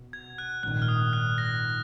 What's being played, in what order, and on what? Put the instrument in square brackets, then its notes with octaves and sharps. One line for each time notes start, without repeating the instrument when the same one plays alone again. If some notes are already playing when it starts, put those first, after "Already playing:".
Already playing: [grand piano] B2
[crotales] G#6
F#6
[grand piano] A#1 G#2 D#3 [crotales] F#6
[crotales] F6
D#6
F#6
A#6